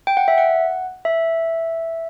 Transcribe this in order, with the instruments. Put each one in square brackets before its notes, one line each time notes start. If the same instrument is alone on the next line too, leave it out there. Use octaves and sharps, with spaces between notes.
[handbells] G5
F#5
E5
F#5
E5